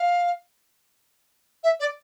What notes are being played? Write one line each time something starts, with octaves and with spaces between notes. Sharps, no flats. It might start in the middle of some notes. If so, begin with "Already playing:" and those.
Already playing: F5
E5
D5